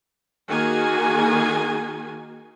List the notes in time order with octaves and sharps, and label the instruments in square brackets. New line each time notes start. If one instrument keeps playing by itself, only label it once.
[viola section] D#3 A#3 F#4 G#4 G#5